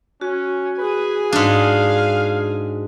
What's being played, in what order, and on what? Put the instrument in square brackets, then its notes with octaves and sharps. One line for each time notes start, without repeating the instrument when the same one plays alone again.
[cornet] C#4 [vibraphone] F#4
[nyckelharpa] G#4 G#5 [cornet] B4
[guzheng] G#2 D4 [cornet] F5